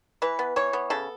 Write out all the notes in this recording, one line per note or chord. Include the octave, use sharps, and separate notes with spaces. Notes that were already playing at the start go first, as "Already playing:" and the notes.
E3 B4
B3
E3 C#5
B3
C#3 A4